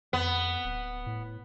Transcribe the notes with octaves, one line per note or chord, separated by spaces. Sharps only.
F2 B3
D1
A2